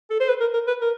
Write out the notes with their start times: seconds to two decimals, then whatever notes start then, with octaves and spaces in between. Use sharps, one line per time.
0.10 A4
0.20 C5
0.28 B4
0.40 A#4
0.54 A#4
0.67 B4
0.81 A#4